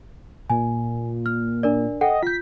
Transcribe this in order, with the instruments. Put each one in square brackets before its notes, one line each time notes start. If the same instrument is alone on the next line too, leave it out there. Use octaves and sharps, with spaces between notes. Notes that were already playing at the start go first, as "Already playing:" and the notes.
[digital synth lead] A#2 [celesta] G#5
[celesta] F6
D4 A#4 D5
[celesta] A4 F#5 G5 [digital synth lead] D#5
[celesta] F4 G6 [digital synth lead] B6